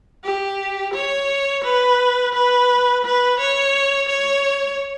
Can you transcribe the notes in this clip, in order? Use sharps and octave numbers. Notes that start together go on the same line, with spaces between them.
G4
C#5
B4
B4
B4
C#5
C#5